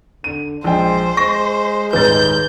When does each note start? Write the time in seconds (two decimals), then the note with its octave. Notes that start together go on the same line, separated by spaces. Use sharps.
0.24 D3 D#7
0.64 A#1 G#3 C5 G5
1.17 G#3 C#6 A#6
1.93 D#1 G#2 B4 G6 A6